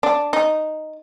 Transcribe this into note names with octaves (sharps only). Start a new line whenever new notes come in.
D4
D#4